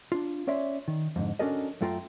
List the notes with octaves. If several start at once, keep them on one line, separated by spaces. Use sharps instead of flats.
D4 F4
C#4 C#5 D5 E5 C6
D#3
F2 G#2 D3
C#4 D4 F#4 A4 A#4 D#5
F#2 A3 F4 G5 A#5 C6